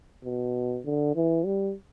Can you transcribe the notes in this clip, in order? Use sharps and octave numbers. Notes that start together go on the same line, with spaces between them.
B2
D3
E3
G3